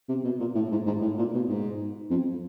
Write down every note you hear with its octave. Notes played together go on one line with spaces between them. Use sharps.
C3
B2
A#2
A2
G#2
G#2
A2
A#2
B2
G#2
F2